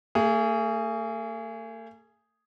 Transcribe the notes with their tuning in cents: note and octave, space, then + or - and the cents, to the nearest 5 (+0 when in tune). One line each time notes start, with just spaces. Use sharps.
A3 +45 G#4 +0